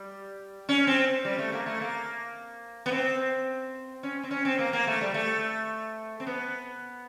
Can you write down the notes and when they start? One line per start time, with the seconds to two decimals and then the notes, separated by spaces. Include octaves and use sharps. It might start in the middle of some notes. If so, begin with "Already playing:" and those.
Already playing: G3
0.69 C#4
0.87 C4
1.25 G3
1.38 A3
1.52 A#3
1.66 A3
1.81 A#3
2.86 B3
2.92 C4
4.03 C#4
4.23 C4
4.31 C#4
4.45 C4
4.59 A#3
4.73 A#3
4.87 A3
5.01 G3
5.14 A3
6.20 C4
6.27 B3